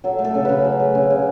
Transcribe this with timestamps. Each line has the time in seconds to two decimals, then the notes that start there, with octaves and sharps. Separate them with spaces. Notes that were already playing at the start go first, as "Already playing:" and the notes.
0.04 F#3 A4
0.19 A3
0.24 A4
0.35 C#3
0.45 C#3 B4
0.64 F#3
0.80 A3
0.95 C#3
1.10 C#3